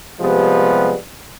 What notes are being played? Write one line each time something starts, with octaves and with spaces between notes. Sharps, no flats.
C3 F3 G3 G#3 B3